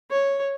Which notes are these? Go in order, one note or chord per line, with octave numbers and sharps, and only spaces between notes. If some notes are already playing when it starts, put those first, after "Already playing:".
C#5